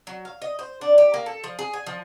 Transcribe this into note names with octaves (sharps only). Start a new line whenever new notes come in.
F#3
F5
D#5
C5
D4
G4
A#3
A4
F3
G#4
G#5
F3